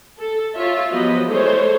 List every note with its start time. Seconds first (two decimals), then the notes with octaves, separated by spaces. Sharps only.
0.17 A4
0.54 F4 C#5 E5
0.92 F3 F#3 B3 G4 D#5 B5
1.27 E3 G#3 A3 A4 C5 C#5